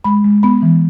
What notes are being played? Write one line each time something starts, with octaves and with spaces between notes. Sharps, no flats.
G#3 B5
G#3
B3 B5
E3